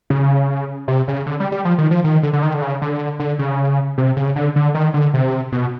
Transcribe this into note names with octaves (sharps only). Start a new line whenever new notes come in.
C#3
C3
C#3
D3
G3
G3
F3
D#3
F3
D#3
D3
D3
D#3
D3
C#3
D3
D3
C#3
C3
C#3
D3
D3
D#3
D3
C3
B2